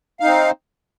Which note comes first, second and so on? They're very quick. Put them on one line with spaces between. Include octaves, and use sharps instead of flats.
F5 D#4 C4